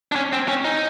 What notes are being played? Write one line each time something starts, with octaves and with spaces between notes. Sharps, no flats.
D4
C#4
C4
C#4
D#4